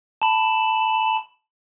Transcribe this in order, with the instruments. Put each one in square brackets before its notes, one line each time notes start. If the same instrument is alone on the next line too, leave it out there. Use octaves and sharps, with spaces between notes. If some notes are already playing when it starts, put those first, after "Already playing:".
[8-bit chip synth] A5 B5